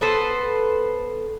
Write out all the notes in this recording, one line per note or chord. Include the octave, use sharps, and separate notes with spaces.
B3 A4 B4 C5